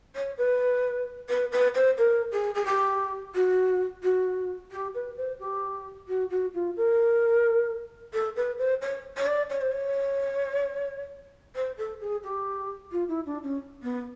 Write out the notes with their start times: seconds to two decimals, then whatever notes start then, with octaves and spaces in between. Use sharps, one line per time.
0.15 C#5
0.38 B4
1.29 B4
1.52 B4
1.74 C5
1.98 A#4
2.31 G#4
2.54 G#4
2.65 G4
3.34 F#4
4.03 F#4
4.71 G4
4.94 B4
5.17 C5
5.39 G4
6.08 F#4
6.30 F#4
6.54 F4
6.76 A#4
8.13 A4
8.36 B4
8.58 C5
8.81 C#5
9.17 C#5
9.26 D5
9.50 C#5
9.61 C5
9.71 C#5
11.55 C5
11.77 A4
12.00 G#4
12.23 G4
12.91 F4
13.08 E4
13.26 D4
13.43 C#4
13.82 B3